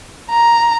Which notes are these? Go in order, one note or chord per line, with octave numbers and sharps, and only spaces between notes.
A#5